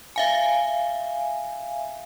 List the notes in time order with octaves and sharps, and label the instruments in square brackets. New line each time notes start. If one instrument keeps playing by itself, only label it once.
[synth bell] E5 F5 G#5